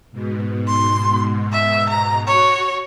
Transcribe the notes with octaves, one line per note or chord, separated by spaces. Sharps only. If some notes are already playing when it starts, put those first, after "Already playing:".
G#2 B2
C6
E5
A#5
F#4 C#5